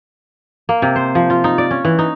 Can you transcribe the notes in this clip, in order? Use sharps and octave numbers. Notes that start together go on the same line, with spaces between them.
A#3
C3
C5
F3
F4
D#4
D5
C#4
E3
D#4